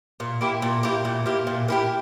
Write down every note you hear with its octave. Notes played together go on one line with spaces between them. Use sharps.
A#2
A#3 E4 G4
A#2
A#3 E4 G4
A#2
A#3 E4 G4
A#2
A#3 E4 G4